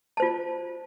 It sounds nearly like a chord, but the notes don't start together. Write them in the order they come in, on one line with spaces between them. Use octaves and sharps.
A5 C5 F4